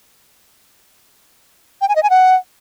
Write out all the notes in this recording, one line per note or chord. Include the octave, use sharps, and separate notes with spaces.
G5
G#5
D#5
G#5
F#5